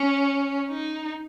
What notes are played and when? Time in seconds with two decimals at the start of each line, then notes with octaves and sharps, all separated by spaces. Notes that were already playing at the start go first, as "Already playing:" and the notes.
Already playing: C#4
0.70 D#4